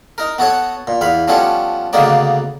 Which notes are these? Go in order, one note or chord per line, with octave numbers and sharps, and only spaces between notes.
D#4 A#4
B3 F#4 A4 C#5
A#2
E2 F5 B5
F3 G3 B3 C#4 A4 C#5
D2 C#3 A#3 B3 D#4 D5